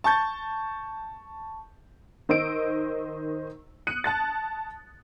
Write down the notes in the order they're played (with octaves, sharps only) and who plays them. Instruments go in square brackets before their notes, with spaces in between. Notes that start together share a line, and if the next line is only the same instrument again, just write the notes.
[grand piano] A5 C#6 G6 A6
[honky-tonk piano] D#3 C5 D#5 E6 D7
D#6 F#6 C#7 D#7
A5 F#6 A6